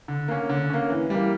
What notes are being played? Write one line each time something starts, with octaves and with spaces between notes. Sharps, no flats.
D3
A#3 C#4
D3
A#3 C#4
E3
G3 A#3